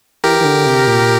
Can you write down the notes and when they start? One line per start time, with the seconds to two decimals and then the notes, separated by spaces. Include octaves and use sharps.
0.24 E3 G4 A#4
0.41 E3
0.44 D3
0.66 C3
0.87 A#2